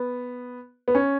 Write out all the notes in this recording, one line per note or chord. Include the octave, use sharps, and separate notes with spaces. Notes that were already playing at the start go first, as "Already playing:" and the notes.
Already playing: B3
B3
C#4